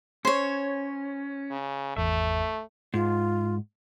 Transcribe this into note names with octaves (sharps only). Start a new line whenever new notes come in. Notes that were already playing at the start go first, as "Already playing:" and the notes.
C#4 C5 C#5
C#3
G#1 E2 A3 E5
G#2 F4